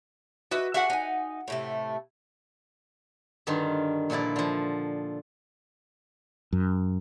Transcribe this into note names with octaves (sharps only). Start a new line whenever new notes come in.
F#4 B4 D#5 E5
D4 F#4 G#4 E5 F#5
D#4 G#5
A2 C3 A3
G2 D3 D#3 F4
A#2 D3 F3 E4 D5
D3 F3
F#2